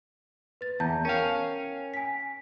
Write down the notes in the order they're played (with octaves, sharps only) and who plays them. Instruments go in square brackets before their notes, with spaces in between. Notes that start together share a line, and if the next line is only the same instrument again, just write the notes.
[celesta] B4 A6
[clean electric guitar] E2 [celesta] A5 A#5 G6
[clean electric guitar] C#4 F5 [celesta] A#4 G5
[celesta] G#5 B6